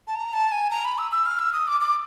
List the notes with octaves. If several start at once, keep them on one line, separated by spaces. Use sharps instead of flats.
A5
A#5
A5
G#5
A#5
B5
E6
E6
F6
E6
D#6
D6
D6